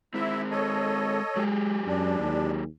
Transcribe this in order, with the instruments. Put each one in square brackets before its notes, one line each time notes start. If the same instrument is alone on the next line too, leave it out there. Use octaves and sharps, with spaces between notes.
[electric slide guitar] G#3 C4 [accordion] E4 E5
[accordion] A4 C#5 D#5
[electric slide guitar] F#3 G4 G#4 [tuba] G#3
[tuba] F#2 [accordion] D4
[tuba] D#2